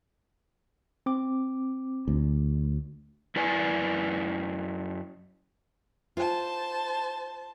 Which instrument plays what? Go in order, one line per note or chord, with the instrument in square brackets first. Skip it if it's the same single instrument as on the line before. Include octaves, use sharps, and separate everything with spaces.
[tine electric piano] C4 D6
[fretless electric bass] D2
[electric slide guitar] F#2 E4 B4 D5 G#5
[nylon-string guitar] F4 [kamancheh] C5 A5